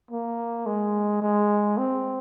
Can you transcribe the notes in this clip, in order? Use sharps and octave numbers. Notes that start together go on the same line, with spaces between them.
A#3
G#3
G#3
C4